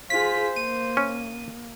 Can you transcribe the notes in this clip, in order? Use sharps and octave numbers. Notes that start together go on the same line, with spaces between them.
F4 G#4 C5 B6
A#3 D#7
C#4